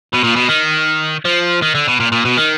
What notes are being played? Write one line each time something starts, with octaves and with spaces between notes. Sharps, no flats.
B2
A#2
B2
D#3
F3
D#3
D3
B2
A#2
A#2
B2
D#3